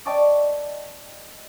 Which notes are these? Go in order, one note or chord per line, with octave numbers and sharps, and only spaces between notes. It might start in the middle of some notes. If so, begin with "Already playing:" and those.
D5 D#5 G5 A5 C#6 D6